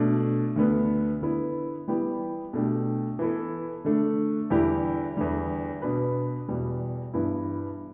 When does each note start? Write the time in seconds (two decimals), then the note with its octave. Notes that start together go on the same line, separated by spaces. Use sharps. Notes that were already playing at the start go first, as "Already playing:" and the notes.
Already playing: B2 A3 D4
0.56 D2 D3 B3
1.22 D3 B3 E4 B4
1.88 E3 G3 B3 E4 G4
2.53 B2 A3 D4 G4
3.19 E3 B3 E4 A4
3.85 D3 A3 D4
4.50 E2 D3 G3 E4 G4
5.17 E2 D3 G3
5.82 B2 B3 D4 B4
6.48 E2 B2 G3
7.14 G2 E3 B3 E4